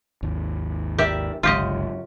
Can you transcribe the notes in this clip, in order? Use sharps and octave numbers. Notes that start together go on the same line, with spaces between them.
G#1 D#2
G4 A#4 D5 E5
G1 C#2 F#2 F4 G4 D#5